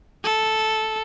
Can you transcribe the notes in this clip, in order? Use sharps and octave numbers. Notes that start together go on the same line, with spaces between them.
A4